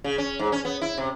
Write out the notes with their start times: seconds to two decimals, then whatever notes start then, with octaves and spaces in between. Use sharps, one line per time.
0.04 C#3
0.18 C#4
0.39 G#2
0.52 C#4
0.65 B3
0.82 E4
0.98 C3